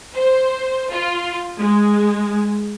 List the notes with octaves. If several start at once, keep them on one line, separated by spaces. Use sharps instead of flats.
C5
F4
G#3